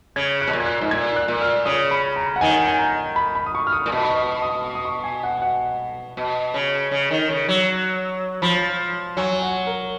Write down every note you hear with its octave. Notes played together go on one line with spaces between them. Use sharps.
C#3 G#6
F#6
B2
A#2
G#6
F#6
G#2
A#2 G#6
F#6
A#2
F6
C#3 D#6
B5
A#5
F#5
D#3 G#5
G#5
A#5
B5
B5
D#6
C#6
F6
D#6
A#2
B2
B5
C#6
D#6
D#6
D#6
C#6
G#5
F#5
G#5
F#5
B2
C#3
C#3
D#3
C#3
F#3
F3 B5
F#3 G#5
G#5
F#5
A#4